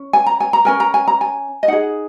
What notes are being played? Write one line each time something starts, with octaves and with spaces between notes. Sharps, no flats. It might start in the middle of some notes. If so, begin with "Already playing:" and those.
Already playing: C#4
G#5
A#5
G#5
A#5
C#4 A#4 G#5
A#5
G#5
A#5
G#5
D#5
D#4 G#4 F#5